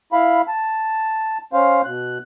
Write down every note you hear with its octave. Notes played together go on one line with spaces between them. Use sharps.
E4 F5 B5
A5
C#4 C5 F5
B2 F#6